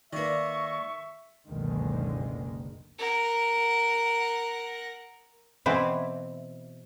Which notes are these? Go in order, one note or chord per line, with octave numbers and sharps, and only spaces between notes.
D#3 A#3 B4 D5 E5 C#6
F#1 C#2 B2 D3 D#3 G#3
A#4 F#5
B2 E3 C4 E4